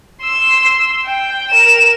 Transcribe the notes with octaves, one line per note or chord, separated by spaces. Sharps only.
C6 E6
G5
A#4 E7